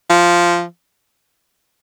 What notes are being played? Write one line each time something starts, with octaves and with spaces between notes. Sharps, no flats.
F3